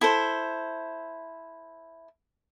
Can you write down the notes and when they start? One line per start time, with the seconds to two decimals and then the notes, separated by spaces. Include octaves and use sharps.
0.01 E4 A4 C5